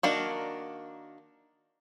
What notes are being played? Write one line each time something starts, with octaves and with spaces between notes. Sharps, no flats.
D#3 A#3 D4 F#4